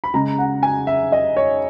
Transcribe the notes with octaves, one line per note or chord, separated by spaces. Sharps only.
B5
C#3 G#3 A#5
F#5
G#5
E5
D#5
C#5